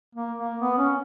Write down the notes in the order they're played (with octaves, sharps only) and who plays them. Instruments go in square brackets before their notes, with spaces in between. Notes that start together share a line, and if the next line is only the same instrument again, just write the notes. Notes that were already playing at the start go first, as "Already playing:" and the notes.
[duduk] A#3
A#3
B3
C#4